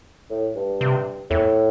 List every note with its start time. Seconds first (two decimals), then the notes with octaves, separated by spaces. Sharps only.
0.30 A2
0.55 G2
0.81 C3
1.31 E2 A2